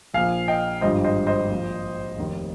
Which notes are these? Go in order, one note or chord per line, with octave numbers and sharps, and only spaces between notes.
A#1 A#2 F3 F5 G#5
D#5 G5
G#1 G2 F3 C5 D#5
C5 D#5
C5 D#5
A#1 A#2 F3
F1 D#2 D#3